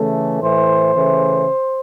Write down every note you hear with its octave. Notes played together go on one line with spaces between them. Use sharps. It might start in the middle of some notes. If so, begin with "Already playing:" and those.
Already playing: C#3 E3 A3
A2 E3 A3 C5
C#3 E3 A3